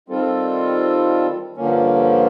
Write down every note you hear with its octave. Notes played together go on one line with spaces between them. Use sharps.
D#3 G3 C4 F4 A4
G2 D3 F3 A#3 C#4